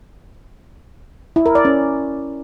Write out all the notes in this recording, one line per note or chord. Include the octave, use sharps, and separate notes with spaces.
E4
A#4
D5
C#4